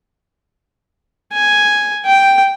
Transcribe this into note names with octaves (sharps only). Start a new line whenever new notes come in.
G#5
G5